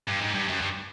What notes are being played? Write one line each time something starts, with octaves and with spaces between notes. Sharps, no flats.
G2
G#2
G2
F#2
G2